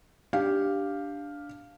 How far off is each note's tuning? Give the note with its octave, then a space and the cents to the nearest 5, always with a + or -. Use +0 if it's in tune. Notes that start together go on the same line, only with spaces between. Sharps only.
D4 -5 G4 +0 F5 +0